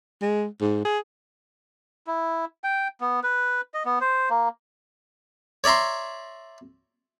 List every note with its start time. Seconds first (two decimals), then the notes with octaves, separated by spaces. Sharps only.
0.22 G#3
0.61 G#2
0.85 G#4
2.07 E4
2.64 G5
3.01 B3
3.23 B4
3.74 D#5
3.85 B3
4.01 C5
4.30 A#3
5.64 C#5 D5 E5 A#5 C6